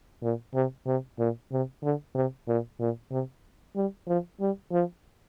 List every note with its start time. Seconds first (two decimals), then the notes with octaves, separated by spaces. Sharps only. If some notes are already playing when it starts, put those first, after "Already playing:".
0.23 A#2
0.54 C3
0.86 C3
1.19 A#2
1.52 C3
1.83 D3
2.15 C3
2.48 A#2
2.80 A#2
3.11 C3
3.76 G3
4.08 F3
4.40 G3
4.72 F3